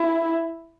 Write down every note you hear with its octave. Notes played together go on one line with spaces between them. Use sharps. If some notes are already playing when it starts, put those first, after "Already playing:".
Already playing: E4